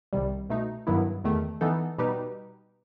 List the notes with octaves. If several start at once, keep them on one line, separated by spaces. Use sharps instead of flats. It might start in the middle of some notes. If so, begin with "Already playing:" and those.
C2 C3 D#3 G3
B2 A3 D#4
G2 D#3 F#3 B3 E4
E2 D#3 A3
E3 B3 D#4 A4
B2 G3 D#4 G4 B4